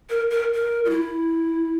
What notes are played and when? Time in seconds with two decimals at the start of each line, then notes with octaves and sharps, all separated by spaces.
0.10 A#4
0.32 A#4
0.54 A#4
0.85 F4
0.90 E4